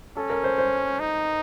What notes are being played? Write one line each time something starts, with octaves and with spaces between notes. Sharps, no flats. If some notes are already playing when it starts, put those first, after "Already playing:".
C#4 A4
A#4
C5
C5
D#4